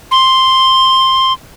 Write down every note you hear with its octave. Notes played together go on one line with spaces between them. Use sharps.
C6